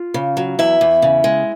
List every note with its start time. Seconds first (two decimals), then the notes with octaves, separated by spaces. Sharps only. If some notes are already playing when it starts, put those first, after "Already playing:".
Already playing: F4
0.14 C#3
0.37 F#3
0.59 E2 E4 E5
0.81 E2
1.02 C#3
1.24 G#3